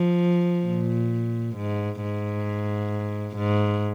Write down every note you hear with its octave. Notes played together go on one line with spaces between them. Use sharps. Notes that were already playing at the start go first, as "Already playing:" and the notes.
Already playing: F3
A#2
G#2
G#2
G#2